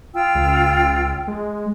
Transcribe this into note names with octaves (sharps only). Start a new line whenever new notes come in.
F4 G5 E6
C#2
G#3